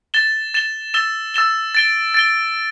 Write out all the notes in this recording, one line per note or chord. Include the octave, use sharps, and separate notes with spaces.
A6 E7 G7
A6 E7 G7
E6 A6 E7 G7
E6 A6 E7 G7
A6 D7 G7
A6 D7 G7